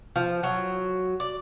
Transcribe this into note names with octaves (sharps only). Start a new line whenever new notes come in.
F3
F#3
D5